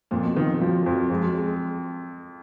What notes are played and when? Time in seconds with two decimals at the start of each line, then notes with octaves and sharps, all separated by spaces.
0.11 F2 A#2
0.23 B2
0.36 D#3 F3
0.61 F3 F#3
0.85 F2 F#3
1.10 F2 G#3
1.22 F#3
1.35 G#3